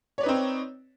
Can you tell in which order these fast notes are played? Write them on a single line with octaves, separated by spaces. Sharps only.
C#5 D5 B4 D#4 C4